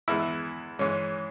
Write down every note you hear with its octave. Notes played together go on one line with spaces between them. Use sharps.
E2 E3 G#3 E4
G#2 E3 G#3 C#4